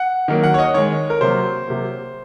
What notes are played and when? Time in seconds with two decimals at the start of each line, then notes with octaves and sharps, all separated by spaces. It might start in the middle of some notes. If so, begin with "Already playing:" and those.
Already playing: F#5
0.28 D#3 F#3 A#3
0.43 F#5
0.54 C#5
0.59 D#5
0.74 D#3 G#3 C#5
1.10 A#4
1.21 C3 F#3 A#3 C5
1.67 C3 F#3 A#3